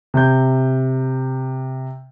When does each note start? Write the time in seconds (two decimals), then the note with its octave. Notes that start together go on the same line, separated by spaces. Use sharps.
0.14 C3 G6